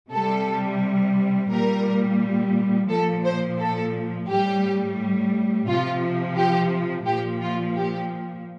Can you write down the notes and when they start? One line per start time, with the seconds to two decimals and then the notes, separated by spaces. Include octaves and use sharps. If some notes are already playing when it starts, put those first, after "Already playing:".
0.12 C3 G3 A4
1.51 A#2 G3 A#4
2.90 A#2 F3 A4
3.24 C5
3.59 A4
4.28 A2 G3 G4
5.67 C3 F3 F4
6.37 G4
7.06 A#2 F3 G4
7.41 F4
7.75 G4